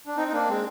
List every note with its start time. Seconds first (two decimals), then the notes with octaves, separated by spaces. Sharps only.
0.07 D4
0.17 C4 D#4
0.28 D#4
0.32 A#3 D4
0.48 G#3 C4